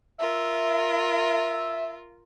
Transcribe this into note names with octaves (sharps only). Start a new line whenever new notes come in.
F4 A#4 E5